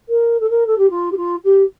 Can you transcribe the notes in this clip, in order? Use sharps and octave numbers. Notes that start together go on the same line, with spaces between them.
A#4
A4
A#4
A4
G4
F4
G4
F4
G4